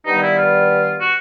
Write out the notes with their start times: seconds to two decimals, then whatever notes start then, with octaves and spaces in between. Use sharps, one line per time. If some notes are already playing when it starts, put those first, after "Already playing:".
0.05 G2 D#3 G3 B3 D#4
0.22 E4
0.37 F4
0.99 F#4